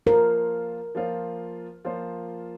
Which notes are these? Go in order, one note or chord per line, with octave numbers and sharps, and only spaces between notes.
F3 A#3 F4 A#4 C5
F3 A#3 F4 C5
F3 A#3 F4 C5